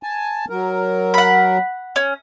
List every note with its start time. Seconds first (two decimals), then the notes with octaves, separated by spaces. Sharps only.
0.03 G#5 A5
0.50 F#3 A#4
1.14 F#5 B5
1.96 C#4